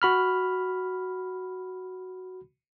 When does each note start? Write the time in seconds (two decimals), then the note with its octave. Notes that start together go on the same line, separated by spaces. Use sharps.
0.02 F#4 B5 F6